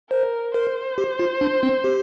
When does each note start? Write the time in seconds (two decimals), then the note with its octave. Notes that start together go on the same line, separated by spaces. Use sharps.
0.11 A#4 C5
0.54 A#4 C5
0.98 G4
1.19 F4
1.41 D4
1.63 C4
1.84 G4